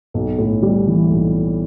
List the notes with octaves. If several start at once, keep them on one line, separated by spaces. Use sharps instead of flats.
B1
A2
G3
E3
B1